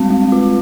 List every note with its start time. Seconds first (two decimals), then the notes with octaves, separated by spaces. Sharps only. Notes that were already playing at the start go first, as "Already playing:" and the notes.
Already playing: G3 G#3 C4
0.10 G#3
0.32 F4